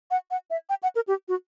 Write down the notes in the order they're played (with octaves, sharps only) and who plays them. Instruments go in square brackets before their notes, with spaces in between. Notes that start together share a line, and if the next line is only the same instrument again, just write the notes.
[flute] F#5
F#5
E5
G5
F#5
A#4
G4
F#4